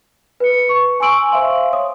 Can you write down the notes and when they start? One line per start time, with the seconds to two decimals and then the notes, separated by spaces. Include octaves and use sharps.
0.40 B4 C#7
0.69 C#6
1.00 G#5 C6 C#6 E6 D7 F#7
1.32 C5 E5 F5 C6
1.72 C#5 D#6